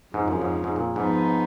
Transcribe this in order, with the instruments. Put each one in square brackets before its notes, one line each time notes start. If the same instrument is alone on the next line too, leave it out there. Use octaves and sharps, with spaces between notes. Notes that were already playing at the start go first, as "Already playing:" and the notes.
[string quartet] F2 C#3 F3 [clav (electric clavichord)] G#2
[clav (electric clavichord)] F#2
G#2
G#2
A#2
[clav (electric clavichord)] G#2 [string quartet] F3 B3 D#4